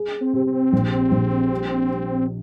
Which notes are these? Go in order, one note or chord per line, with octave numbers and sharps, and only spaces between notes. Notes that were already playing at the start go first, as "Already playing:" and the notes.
Already playing: G#4
C4
C3
C4
A#1
A#1
G3
G3